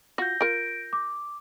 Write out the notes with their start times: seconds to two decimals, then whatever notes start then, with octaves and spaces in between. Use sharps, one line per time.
0.18 F4 F#4 G6 A#6
0.41 F4 A#4 D7
0.93 D6